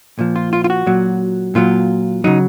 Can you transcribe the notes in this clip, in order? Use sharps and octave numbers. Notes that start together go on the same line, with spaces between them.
A#2 F3
F4
F4
F4
F#4
A#2 F#3
A#2 F#3 F4
C#3 F#3 D#4